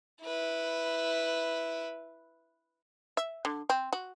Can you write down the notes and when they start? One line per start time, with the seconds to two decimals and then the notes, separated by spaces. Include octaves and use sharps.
0.23 E4 B4
3.17 E5
3.45 D3
3.70 C4
3.93 F#4